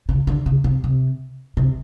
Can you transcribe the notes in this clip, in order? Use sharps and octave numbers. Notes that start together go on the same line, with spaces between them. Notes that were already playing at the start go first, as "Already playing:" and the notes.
C#3
D3
C#3
C3
C3
C3